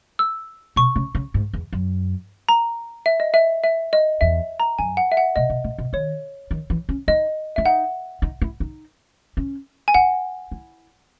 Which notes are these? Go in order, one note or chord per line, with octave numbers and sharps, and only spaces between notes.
E6
B2 C#6
C#3
C#3
G#2
E2
F#2
A#5
E5
D#5
E5
E5
D#5
E2 E5
A#5
F#2 G#5
F#5
E5
F#5
B2 D#5
B2
A#2
B2
D#3 C#5
D#3
E3
C#4
D#4 D#5
E4 E5
D#4 F#5
D#4
E4
D#4
C#4
G#5
D#4 F#5
E4